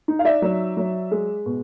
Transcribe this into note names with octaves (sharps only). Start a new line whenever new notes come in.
D#4
F5
D5 E5
F#3
F#3
G#3
B2